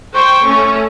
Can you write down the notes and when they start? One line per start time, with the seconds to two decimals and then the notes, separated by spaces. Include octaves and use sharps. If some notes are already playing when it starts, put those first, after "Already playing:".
0.15 C5 G5 C#6
0.46 A3 C#4